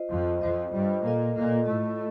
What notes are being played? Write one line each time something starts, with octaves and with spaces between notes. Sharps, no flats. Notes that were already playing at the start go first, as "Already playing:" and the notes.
Already playing: F4 C5 D#5
F2 F3
F2 F3 F4 C5 D#5
G2 G3
A#2 A#3 F4 A4 D#5
A#2 A#3
A2 A3 F4 A4 D#5